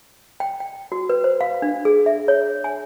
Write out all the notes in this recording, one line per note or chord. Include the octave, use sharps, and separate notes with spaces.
G5
G5
F#4
B4
C5
F5
D4
G#4
E5
C#5
G#5